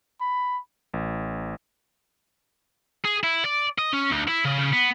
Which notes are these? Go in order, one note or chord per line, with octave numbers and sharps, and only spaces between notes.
B5
A1
G#4
E4
D5
D#5
C#4
D2
E4
C#3
C#3
B3